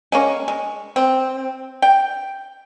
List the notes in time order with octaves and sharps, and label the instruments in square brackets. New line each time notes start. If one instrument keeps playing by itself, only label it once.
[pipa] G#3 A#3 C#4
G#3
C4
G5